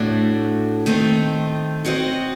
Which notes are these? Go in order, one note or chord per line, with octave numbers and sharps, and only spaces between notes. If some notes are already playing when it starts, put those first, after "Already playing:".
Already playing: A2 A3 D4 F#4
D#3 A3 C4 D#4
F#3 C4 F#4 C5 D#5